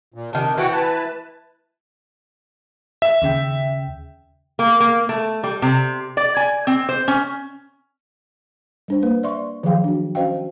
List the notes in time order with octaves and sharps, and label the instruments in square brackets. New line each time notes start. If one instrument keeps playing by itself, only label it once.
[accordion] A#2
[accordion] C3 [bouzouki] D#3 D4
[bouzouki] E3 [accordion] F#4 F#5 G5
[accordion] B4 A5
[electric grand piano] E5
[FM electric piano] D#2 C#3 G5
[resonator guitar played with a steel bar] A#3
A#3
A3
G3
C3
D5
G#5
C4
C5
C#4
[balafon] G3 D4 C5
A#3 B4 C5
D5 E5 C6 C#6
D#3 F3 F#3 G#4 F5 G5
D4 F#4
C#4 F#4 C5 D#5 F5 G5